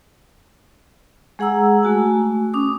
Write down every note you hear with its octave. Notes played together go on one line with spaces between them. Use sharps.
G#3 G#4 F#5 A#5 E6
A3 F#4 G#5
C#4 D6 D#6